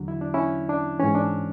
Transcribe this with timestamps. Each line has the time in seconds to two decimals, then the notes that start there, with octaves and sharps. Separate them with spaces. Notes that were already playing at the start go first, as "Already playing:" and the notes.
Already playing: E2 D3 F#3 D4
0.08 E4
0.21 D4
0.34 C#4 E4
0.69 D4
1.00 G#2 E3 C#4
1.15 D4